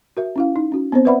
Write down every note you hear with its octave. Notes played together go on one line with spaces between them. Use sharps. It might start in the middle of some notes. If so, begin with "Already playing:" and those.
F#4 A#4 E5
C#4 E4 F5
D#4
C#4 F#4
B3 C4 C5
B4 C5 D5 E5 F#5 B5